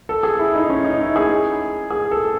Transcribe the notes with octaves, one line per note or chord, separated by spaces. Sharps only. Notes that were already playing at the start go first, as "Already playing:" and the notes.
A4
G#4
E4
D#4
C#4
D#4
E4
G#4
G#4
A4